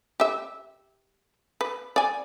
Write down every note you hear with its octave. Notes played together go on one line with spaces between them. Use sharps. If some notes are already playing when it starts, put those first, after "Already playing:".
G4 E5
B4
D5 G#5